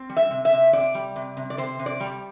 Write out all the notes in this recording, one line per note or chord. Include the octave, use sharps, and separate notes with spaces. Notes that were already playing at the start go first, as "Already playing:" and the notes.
Already playing: C4
G3
E5
C3
E5
C3
C3 D5
G3
C3
C3
D5
C3 C5
C3
D5
G3